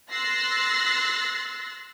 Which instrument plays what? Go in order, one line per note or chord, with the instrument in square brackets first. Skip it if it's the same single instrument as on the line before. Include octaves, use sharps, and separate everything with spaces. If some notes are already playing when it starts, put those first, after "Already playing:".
[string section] C6 E6 F#6 A6 A#6 C7